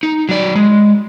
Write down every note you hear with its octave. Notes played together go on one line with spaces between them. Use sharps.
D#4
F#3 D5
G#3